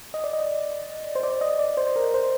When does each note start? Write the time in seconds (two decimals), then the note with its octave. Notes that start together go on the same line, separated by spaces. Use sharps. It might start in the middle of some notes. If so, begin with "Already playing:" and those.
0.14 D#5
0.24 D5
0.33 D#5
1.15 C5
1.23 D5
1.41 D#5
1.59 D5
1.77 C5
1.96 A#4
2.14 C5